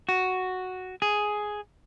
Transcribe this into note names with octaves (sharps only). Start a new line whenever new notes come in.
F#4
G#4